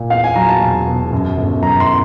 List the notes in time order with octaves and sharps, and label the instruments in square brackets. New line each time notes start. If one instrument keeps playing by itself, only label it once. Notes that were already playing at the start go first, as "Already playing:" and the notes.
Already playing: [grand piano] A#2
E2 F5
G#5
F#3 A#5
A5
E1
B2
F#2
G1
F#2 A#5
C6